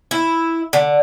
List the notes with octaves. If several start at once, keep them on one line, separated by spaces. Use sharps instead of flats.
E4
D3